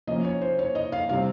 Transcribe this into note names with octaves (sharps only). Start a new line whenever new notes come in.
F3 A#3 C#4 D#5
C#5
C5
C#5
D#5
F5
C3 G3 C4 F5